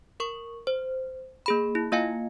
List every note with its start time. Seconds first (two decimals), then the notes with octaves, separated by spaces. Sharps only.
0.20 A#4 C#6
0.67 C5
1.46 A#3 G#4 B5
1.75 E4
1.92 A#3 F4 D#5 F5 G#5